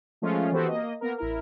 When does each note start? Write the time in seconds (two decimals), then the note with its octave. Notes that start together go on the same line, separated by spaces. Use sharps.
0.22 F3 G#3 A3 C#4 F4
0.52 E3 B3 C4 F#4 G4 A4
0.68 A#3 D#5
1.01 A#3 B3 A#4
1.18 A1 E4 A#4